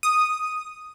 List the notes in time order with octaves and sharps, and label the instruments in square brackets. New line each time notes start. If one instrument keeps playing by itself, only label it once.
[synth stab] D#6